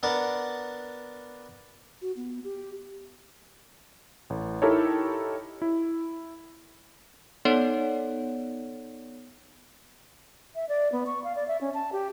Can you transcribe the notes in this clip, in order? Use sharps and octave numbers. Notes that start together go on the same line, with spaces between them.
B3 D4 A#4 D5 F#5
F#4
B3
G4
A1
D#4 E4 G4 A4 A#4 C#5
E4
B3 D#4 A4 C#5 D5 F#5
E5
D5
B3
C#6
F5
D5
E5
C#4
A5
G4